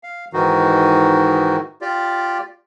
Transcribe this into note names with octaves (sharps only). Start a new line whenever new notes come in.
F5
G#2 D#3 E3 D#4 F#4
F4 G4 D5